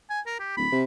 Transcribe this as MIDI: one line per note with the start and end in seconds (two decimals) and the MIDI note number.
0.10 0.20 80
0.26 0.38 70
0.40 0.53 67
0.57 0.67 26
0.57 0.80 83
0.72 0.84 48